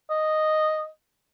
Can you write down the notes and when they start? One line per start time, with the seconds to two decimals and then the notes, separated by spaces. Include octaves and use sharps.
0.10 D#5